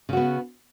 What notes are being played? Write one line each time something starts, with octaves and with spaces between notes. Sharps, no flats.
C#3 B3 F#4